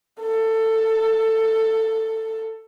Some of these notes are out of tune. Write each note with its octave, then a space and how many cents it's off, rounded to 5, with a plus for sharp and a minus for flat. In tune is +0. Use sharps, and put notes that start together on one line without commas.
A4 +15